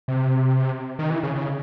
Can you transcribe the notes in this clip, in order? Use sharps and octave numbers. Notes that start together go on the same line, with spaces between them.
C3
D#3
E3
C#3
C#3